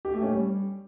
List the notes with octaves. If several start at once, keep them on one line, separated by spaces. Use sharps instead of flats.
G4
A3
C#4
G3